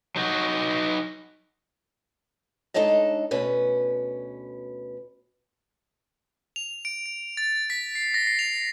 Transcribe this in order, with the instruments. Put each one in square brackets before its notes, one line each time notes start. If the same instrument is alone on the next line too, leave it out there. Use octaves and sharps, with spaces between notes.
[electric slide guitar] F#3 D#4 F#4
[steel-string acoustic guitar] G#3 D4 D#4 A4 C#5 D#5
D2 B2 C#4 B4
[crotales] F7
D7
D7
A6
B6
C7
A#6
C7
F7